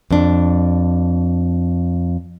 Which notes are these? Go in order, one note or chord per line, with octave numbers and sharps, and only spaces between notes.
F2 D4